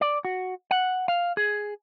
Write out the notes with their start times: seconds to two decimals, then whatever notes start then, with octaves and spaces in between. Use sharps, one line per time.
0.01 D5
0.25 F#4
0.71 F#5
1.08 F5
1.37 G#4